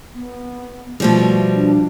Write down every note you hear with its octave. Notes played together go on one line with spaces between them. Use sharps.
B3
B2 F3 G3 A3
D4